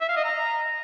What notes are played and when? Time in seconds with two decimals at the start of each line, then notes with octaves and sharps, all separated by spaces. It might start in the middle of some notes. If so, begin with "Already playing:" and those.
0.01 E5
0.09 F5
0.17 D#5
0.24 A#5